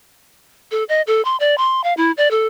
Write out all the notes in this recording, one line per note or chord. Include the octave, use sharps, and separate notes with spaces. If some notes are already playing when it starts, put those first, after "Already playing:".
A4
D#5
A4
C6
D5
C6
F5
E4
D5
A4